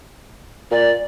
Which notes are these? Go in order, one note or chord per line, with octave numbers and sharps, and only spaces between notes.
A#2 D5